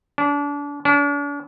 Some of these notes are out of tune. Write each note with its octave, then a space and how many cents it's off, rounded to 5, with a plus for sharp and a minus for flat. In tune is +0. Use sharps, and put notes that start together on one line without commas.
D4 -30
D4 -40